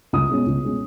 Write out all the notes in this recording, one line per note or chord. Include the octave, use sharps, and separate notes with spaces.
C#2 D#6
B2 G#3 C#4
C#2
B2 G#3 C#4